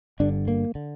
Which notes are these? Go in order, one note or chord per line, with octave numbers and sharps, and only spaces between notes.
G1 G2 D3 D4
A#3
D3